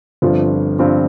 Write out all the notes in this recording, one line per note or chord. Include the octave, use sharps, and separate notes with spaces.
G1 G2 F3 C4 F4
G1 G2 F3 C4 F4